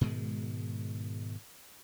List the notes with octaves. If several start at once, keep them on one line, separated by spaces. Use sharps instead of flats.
G#2 B2 D#3 G#3